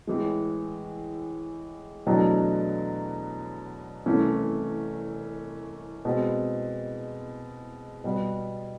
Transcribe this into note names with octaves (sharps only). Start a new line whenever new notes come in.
A2 E3 G#3
E2 B2 F#3 A3 D4
C2 C3 E3 A3 C#4
B2 G#3 C4
B2 G3 B3